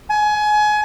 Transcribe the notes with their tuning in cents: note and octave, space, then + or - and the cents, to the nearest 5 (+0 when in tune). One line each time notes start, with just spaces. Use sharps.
G#5 +25